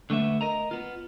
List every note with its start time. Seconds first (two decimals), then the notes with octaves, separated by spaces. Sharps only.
0.10 D3 A3 B3 E5
0.41 A#4 D#5 A#5
0.71 B3 F4